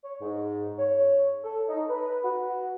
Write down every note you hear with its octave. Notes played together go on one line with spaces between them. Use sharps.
C#5
G#2
C#5
A4
D#4
B4
F#4